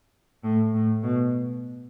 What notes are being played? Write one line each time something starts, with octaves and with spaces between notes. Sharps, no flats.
A2
A2
B2